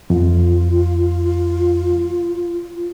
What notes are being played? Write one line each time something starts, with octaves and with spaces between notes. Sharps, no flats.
F2 F4